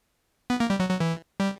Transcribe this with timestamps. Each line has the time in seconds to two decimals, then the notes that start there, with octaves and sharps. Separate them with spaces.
0.50 B3
0.60 A#3
0.70 G3
0.80 F#3
0.90 F#3
1.00 E3
1.40 G3